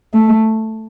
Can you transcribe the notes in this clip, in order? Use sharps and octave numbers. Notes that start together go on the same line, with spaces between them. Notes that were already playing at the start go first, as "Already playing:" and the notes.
A3